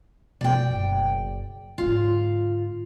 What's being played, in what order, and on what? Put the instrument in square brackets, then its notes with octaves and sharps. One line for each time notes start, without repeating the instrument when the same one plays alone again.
[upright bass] B2 A3 [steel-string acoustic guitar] D5 G5
[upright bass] F#1
[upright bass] G#2 D3 [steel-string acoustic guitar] F4